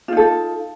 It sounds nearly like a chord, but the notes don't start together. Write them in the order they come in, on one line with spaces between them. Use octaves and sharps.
F4 D#4 A4